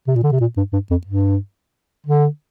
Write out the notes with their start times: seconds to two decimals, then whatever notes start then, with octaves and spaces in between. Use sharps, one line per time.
0.08 C3
0.16 A#2
0.24 D3
0.32 C3
0.41 A#2
0.57 G2
0.73 G2
0.91 F2
1.07 G2
2.06 D3